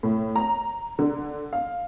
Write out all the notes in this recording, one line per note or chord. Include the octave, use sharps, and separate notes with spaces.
A2
A#5
D3
F5